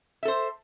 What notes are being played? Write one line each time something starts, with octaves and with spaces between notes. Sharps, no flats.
A4 C5 E5